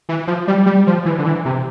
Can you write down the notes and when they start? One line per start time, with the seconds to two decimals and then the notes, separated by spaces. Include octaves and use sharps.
0.09 E3
0.27 F3
0.48 G3
0.66 G3
0.87 F3
1.05 E3
1.19 D3
1.26 E3
1.45 C3